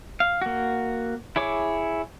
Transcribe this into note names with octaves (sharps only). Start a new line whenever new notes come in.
F5
A#3 F#4
E4 G#4 C#5 D6